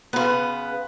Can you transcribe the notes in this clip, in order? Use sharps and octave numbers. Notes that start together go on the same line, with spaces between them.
C#3 B3 B4 C6